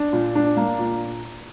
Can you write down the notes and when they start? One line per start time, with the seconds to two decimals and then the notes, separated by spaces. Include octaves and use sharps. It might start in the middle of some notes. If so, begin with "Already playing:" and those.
Already playing: D4
0.13 A#2
0.35 D4
0.57 A#3
0.79 A#2